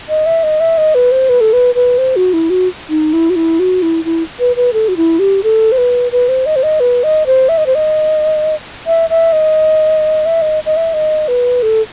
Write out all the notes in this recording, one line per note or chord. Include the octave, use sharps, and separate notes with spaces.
D#5
E5
D#5
E5
D#5
B4
C5
B4
A4
B4
B4
C5
F#4
E4
F#4
D#4
E4
F#4
E4
F#4
E4
E4
B4
B4
A4
F#4
E4
G4
A4
C5
B4
B4
C5
D#5
C5
D#5
B4
D#5
C5
E5
D#5
C5
D#5
E5
E5
D#5
E5
D#5
D#5
E5
D#5
B4
A4